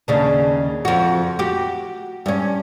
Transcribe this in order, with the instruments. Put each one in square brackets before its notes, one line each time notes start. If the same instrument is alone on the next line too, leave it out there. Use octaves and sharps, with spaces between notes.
[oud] D#2 C#3 D4
F2 F#4
F#4 G4
G2 C#4